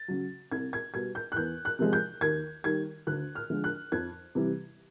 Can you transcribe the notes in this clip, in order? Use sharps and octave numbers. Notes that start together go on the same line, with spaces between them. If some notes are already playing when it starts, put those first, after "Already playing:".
Already playing: A6
C#3 F#3
C2 G#6
G#6
B2 G3 G#6
G6
F#6
E2 G6
F#6
C3 F3 G#3
G6
D#2 G#6
D#3 G3 G#6
D2 F#6
F6
D3 F3 G#3
F#6
F2 G#6
C3 E3 G3